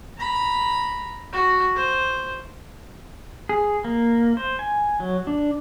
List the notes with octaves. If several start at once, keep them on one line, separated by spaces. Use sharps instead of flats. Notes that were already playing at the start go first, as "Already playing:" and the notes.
A#5 B5
F#4
C5
G#4
A#3
C5
G#5
F#3
D4